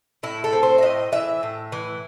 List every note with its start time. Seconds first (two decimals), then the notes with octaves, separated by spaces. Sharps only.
0.23 A2 E4
0.44 A4
0.53 C4
0.63 C5
0.78 E5
0.82 A2 D#5
1.12 E3 E5
1.43 A2
1.72 E3